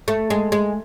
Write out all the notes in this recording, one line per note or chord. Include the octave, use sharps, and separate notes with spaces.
A3
G#3
G#3